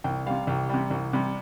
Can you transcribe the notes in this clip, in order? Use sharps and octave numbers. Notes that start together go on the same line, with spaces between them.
C2 G5
C3 G3 F5
C2 G4
C3 G3
C2
C3 G3